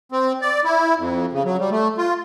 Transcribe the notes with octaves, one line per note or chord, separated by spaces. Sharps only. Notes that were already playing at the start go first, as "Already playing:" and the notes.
C4
D5
E4
F2
C#3
F#3
G3
A3
F4